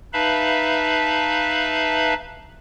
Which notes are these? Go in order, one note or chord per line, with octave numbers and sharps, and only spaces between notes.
D#4 B4 E5 F5 A5 B5